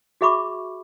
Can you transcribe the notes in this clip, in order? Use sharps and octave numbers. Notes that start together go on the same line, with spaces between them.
F#4 G#4 E5 B5 C#6 D6